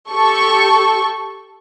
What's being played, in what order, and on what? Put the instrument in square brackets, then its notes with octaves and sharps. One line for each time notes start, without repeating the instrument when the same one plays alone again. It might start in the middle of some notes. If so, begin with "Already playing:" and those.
[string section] G4 A4 C#6